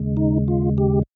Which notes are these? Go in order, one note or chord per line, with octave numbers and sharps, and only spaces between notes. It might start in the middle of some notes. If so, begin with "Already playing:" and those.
Already playing: D#2 C#3 G#3
D#4
F4
G4